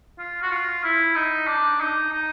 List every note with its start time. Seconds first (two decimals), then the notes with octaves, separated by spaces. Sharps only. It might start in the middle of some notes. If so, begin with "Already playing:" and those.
0.19 F4
0.42 F#4
0.51 F4
0.84 E4
1.15 D#4
1.47 D4
1.80 D#4
2.12 D#4